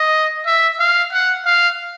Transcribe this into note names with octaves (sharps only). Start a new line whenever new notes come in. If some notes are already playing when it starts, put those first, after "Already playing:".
Already playing: D#5
E5
F5
F#5
F5